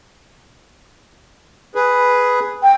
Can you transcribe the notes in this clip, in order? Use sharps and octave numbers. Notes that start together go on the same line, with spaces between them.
G#4 B4
G5